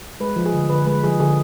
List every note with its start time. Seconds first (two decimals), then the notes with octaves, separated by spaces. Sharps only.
0.20 G#3 B4
0.36 F3
0.46 G#4
0.53 D3
0.70 D3 B4
0.86 G#3 B4
1.04 F3 G#4
1.20 D3 G#4